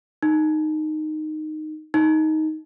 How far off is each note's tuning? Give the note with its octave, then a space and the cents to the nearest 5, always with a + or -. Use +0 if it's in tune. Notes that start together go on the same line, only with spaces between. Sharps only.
D#4 -10
D#4 +10